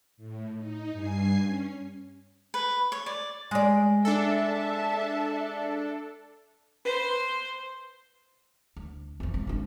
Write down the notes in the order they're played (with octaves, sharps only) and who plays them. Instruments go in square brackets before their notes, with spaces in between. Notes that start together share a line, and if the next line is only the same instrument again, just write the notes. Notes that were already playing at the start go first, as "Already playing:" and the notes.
[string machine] A2
D#4
G2 G#5 C7
C#4
[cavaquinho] B4
C#5
D5
[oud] G#3 D5
[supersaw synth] D4 A4 [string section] E5 A5
[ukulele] B4 [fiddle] C5
[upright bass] D2
F1 E2
G#1
G#2 D3